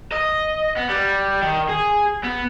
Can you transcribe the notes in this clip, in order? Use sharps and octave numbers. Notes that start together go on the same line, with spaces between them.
D#5
B3
G3
D#3
G#4
B3